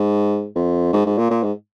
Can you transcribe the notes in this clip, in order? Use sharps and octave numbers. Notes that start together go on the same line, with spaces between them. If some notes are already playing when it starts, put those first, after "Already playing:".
Already playing: G#2
F2
G#2
G#2
A#2
A#2
G#2